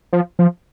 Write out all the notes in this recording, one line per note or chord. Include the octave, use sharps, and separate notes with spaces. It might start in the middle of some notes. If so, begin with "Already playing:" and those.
F3
F3